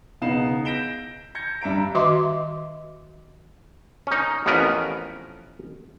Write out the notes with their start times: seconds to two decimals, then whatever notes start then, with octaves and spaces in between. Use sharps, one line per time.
0.21 E1 C#3 B3 D#4 C7 E7
0.65 G6 A#6 B6 D7 E7 G7
1.35 G6 G#6 A#6 C#7
1.61 G2 E5 A#5 D7
1.95 D#3 F#4 D#5 E5 C6 D6
4.07 C#4 D#4
4.46 A1 F2 B3 C#4 A#4 B4